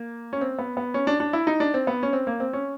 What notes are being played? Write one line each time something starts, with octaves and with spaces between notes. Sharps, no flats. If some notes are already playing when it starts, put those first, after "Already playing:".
Already playing: A#3
C#4
C4
B3
B3
C#4
D4
D4
E4
D#4
D4
C4
B3
C#4
C4
A#3
C4
C#4